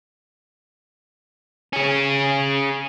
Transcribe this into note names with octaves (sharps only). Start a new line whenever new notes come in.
C#4 G#4